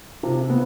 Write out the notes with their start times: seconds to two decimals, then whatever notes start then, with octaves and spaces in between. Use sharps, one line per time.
0.23 C3
0.50 B3